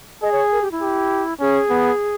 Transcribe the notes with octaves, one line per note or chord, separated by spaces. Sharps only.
G#4 D#5
C#5
A#4
G4
E4
G4
C#4 G#4
B3